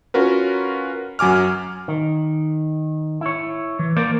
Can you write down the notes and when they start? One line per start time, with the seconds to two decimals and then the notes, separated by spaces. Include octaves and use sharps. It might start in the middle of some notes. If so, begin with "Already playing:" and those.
0.14 C#4 F4 F#4 A#4 B4
1.19 F#2 F#3 G#5 D6 F6
1.88 D#3
3.21 E4 C#5
3.79 E3
3.97 A#3 A#4 C5 D5